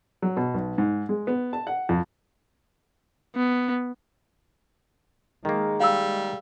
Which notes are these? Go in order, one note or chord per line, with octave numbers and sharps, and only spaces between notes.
F#3
B2
B1
G#2
G#3
B3
A5
F#5
F2
B3
D#3 G#3 A#3
G3 F5 E6